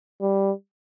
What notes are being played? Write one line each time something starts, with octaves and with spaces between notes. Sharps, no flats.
G3